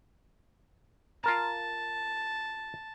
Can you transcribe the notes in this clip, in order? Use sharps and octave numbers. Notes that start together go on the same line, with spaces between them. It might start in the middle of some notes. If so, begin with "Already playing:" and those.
F4 A#4 A5 A#5